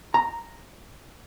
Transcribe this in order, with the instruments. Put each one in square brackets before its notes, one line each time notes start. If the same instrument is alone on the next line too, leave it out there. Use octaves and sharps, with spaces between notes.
[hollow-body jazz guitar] A#5